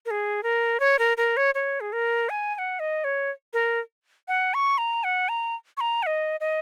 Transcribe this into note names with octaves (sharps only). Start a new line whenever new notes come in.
A#4
G#4
A#4
C#5
A#4
A#4
C#5
C#5
G#4
A#4
G#5
G#5
F#5
D#5
C#5
A#4
F#5
C#6
A#5
F#5
A#5
C#6
A#5
F#5
D#5
D#5